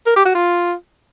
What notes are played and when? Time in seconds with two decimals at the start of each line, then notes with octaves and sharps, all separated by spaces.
0.06 A#4
0.16 G4
0.25 F#4
0.35 F4